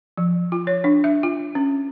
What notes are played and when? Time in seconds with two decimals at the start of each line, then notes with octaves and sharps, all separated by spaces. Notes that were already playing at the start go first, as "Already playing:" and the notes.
0.17 F3
0.52 F4
0.67 C#5
0.84 D4
1.04 E5
1.23 F4
1.55 C#4